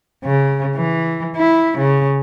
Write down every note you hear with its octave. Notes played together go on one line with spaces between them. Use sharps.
C#3
E3
E4
C#3